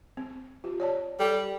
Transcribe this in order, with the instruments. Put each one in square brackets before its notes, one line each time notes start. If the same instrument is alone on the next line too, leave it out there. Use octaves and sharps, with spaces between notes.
[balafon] C4
F4 G4
C#5 D5 A5
[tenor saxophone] G3 [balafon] A4